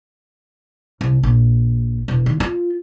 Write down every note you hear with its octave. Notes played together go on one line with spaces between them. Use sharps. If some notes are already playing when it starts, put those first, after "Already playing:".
C2
A#1
E1
D#3
F4